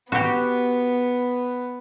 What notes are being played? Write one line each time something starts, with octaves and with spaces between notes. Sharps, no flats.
B3 F#4 G4